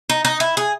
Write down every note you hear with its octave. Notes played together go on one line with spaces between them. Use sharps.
D#4
D#4
E4
G#4